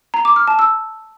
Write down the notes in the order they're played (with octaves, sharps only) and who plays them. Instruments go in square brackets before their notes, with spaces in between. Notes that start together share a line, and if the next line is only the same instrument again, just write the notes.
[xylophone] A#5
D6
F6
A5
E6